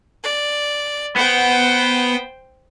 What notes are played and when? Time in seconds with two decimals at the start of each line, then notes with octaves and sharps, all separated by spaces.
0.23 D5
1.16 B3 C5 G5